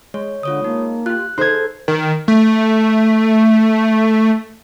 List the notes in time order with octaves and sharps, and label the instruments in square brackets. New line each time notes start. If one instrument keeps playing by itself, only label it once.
[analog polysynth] G#3 [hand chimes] C#5
[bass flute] D3 [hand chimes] F4 C#5 D#6
[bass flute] A#3 [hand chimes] D#4
[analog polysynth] F4 G4 [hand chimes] F#6
[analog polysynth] D#4 G#4 [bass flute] A4 [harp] C5 G#6
[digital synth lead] D#3
A3